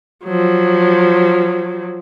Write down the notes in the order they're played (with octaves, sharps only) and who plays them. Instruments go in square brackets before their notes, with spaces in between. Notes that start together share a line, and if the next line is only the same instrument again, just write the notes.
[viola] F3 F#3